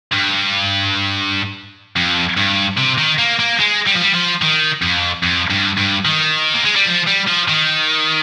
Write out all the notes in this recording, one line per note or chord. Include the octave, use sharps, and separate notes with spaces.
G2
F2
G2
C3
D#3
A#3
A#3
G#3
G3
F3
G3
F3
D#3
F2
F2
G2
G2
D#3
A#3
G#3
G3
F3
G3
F3
D#3